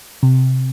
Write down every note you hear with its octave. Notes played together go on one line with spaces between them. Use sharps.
C3